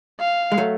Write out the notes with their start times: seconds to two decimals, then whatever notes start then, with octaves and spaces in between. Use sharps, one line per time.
0.20 F5
0.52 G#3
0.58 F#3 A3